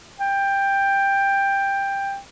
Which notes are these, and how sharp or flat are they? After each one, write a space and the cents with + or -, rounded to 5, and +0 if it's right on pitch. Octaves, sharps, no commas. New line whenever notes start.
G5 +10